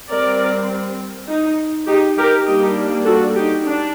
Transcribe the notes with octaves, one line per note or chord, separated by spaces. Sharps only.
G3 C4 A#4 D5
D#4
D#4 G4
G4 A#4
G3 A#3 D4 D#4 G4
F#4 A4
D#4 G4
D4